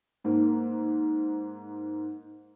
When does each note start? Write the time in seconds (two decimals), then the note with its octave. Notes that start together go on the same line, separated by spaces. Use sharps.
0.24 G#2 A#3